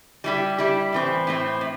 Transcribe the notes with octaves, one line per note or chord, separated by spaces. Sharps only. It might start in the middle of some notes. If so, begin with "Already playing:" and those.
G3 E4 G4
G3 E4 G4
A2 E3 C4
A2 E3 C4
A2